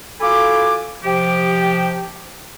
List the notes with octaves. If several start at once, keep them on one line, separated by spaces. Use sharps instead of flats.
F4 F#4 A4 G#5 B5 D6
C3 F3 G4